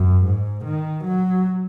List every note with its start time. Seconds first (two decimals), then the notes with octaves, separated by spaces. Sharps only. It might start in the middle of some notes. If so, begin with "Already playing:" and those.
Already playing: F#2
0.24 G#2
0.65 D#3
1.04 F#3